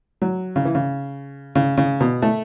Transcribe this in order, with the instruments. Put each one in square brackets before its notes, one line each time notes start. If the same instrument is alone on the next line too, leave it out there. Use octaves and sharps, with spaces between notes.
[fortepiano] F#3
C#3
E3
C#3
C#3
C#3
B2
A3